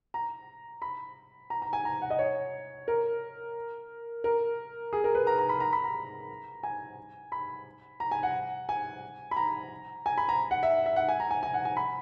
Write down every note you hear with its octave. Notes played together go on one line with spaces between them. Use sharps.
A#5
B5
A#5
A#5
G#5
A#5
F#5
D#5
C#5
A#4
A#4
G#4
A#4
B4
A#5
A#5
B5
A#5
B5
A#5
G#5
B5
A#5
G#5
F#5
G#5
B5
A#5
G#5
B5
A#5
F#5
E5
E5
F#5
G#5
A#5
G#5
G#5
F#5
G#5
B5